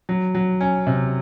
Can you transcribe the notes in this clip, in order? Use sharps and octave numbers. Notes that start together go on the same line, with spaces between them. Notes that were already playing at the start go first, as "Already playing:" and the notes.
F#3
F#3
C#4
C3